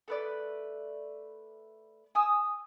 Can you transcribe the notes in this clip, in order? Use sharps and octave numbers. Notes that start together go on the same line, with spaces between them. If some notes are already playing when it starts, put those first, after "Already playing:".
A3 B4 D5
G#5 D#6 E6